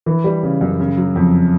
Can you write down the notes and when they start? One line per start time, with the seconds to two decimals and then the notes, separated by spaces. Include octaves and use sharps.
0.06 E3
0.24 G3
0.43 C#3
0.61 F#2
0.80 C#3
0.97 F#3
1.16 F2